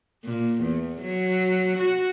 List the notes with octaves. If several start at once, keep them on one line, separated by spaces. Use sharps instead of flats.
A#2
E2
F#3
F#4